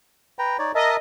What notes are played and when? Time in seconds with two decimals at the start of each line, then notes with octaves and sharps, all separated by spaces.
0.39 B4 G5 A#5
0.59 D#4 C#5 D5
0.75 A#4 D#5 E5 A5